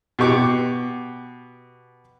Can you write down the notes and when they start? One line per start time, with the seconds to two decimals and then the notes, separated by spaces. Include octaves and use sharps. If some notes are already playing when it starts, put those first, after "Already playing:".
0.19 B2 G4 C#6 D6